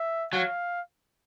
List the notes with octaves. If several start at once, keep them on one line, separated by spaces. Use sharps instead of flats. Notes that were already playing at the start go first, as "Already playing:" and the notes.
Already playing: E5
F#3 F5